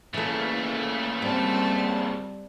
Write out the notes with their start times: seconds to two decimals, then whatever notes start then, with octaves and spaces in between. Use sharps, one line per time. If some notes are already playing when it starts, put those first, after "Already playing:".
0.14 A#2 C#3 E3 A3 A4
1.22 G3 C4 A5